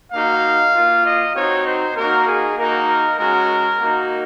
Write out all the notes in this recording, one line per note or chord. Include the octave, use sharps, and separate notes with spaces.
A#3 D#4 F#4 F5
A#3 F4
D#5
C4 D#4 F#4 C#5
C5
A#3 D#4 F#4 A#4
G#4
A#3 D#4 F#4 A#4
A#4
G#3 C#4 F#4 A#4
A#3 D#4 F#4